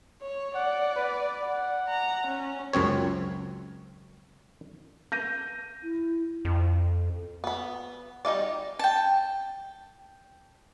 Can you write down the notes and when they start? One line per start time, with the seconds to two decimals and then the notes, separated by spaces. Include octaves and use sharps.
0.22 C#5
0.55 D5 F#5
0.96 B4
1.44 F#5
1.89 A#5
2.27 C#4
2.73 C#2 F#2 C4 C#5
5.12 G6 A#6 D#7
5.83 E4
6.45 F2
7.44 B3 B5
8.25 G3 D#4 F4 D5
8.79 G5 A5